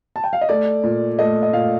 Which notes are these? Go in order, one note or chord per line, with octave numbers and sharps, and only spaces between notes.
A5
G5
F5
D#5
A3 D5
A#2
A3 D#5
D#5
A#2 F5